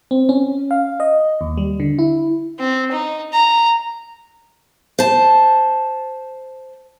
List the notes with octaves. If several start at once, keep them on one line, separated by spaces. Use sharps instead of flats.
C4
C#4
F5
D#5
D#2
G3
D3
E4
C4
D#4
A#5
C5 A5